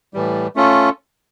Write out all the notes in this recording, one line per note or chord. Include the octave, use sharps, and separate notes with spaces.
A2 E3 G3
A3 C#4 F4 A4